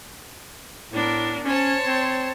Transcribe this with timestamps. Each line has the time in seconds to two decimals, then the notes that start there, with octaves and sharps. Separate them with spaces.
0.92 A2 B3 D4 A#4
1.44 C#4 C5 C#5 A5
1.86 C4